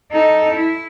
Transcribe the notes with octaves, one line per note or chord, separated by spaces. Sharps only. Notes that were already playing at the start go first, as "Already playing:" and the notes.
D#4 A4
E4